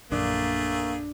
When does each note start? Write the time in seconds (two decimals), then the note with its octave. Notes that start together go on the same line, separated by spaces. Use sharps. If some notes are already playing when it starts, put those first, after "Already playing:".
0.12 A#1 F#2 A3 A#3 D4 G#4